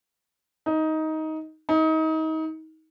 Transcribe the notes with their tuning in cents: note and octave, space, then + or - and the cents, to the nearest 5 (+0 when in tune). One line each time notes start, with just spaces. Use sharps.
D#4 +15
D#4 +30